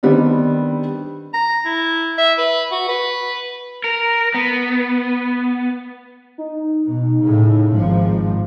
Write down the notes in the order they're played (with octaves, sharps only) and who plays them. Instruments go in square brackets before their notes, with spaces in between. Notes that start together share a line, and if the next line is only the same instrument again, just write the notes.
[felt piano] D#3 G3 B3 C4 D4
[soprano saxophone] A#5
E4
E5
B4
F#4
B4
[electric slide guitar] A#4
B3
[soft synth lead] D#4
[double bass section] B2
A2 C#3
[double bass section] G#1 F3 [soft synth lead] G#2